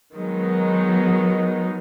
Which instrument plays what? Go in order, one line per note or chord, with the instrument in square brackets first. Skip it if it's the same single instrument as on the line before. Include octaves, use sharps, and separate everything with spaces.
[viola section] D#3 G#3 B3 D#4 [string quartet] F#3